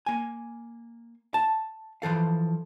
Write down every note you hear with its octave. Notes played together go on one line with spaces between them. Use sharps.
A#3 G#5
A5
E3 F3 A4 F5